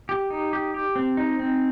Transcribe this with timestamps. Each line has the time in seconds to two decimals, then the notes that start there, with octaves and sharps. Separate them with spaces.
0.09 G4
0.30 D#4
0.53 G4
0.74 G4
0.96 C4
1.17 D#4
1.39 C4